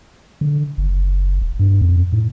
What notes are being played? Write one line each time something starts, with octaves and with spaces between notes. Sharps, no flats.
D3
F#1
D#1
G2
F2
A2